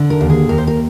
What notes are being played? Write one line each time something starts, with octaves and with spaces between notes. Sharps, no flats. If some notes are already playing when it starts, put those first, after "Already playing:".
Already playing: D3
A#4
D#2
G#4
D#2 A#4
C5
A#4